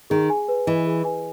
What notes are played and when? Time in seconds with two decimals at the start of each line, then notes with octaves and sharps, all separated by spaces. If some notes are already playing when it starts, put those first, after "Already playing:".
0.10 D#3 G#4
0.30 G#5
0.48 B4
0.67 E3 D#5
0.86 G#4
1.05 G#5